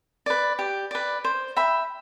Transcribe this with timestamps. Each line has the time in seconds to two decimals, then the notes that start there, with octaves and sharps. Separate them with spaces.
0.26 B4 D5
0.59 G4
0.91 B4 D5
1.24 C5
1.56 E5 G5 B5